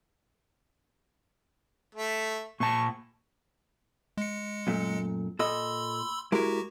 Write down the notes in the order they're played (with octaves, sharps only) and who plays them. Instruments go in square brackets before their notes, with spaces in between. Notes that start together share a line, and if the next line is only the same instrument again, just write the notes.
[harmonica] A3 E5
[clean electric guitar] A#2 A5 [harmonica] C#6
[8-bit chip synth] G#3 C#7
[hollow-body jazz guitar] F#2 A#2 A3
[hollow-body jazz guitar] A#2 A4 D#5 [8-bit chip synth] B5 C6 E6
[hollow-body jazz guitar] G#3 E4 A#4 [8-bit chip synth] F#4 G4